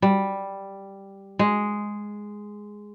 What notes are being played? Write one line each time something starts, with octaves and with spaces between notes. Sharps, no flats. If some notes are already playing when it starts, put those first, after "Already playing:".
G3
G#3